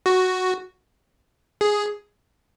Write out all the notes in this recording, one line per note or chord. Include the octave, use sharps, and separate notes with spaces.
F#4
G#4